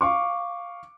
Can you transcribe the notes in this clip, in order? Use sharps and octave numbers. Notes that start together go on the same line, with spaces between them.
F5 C#6 D6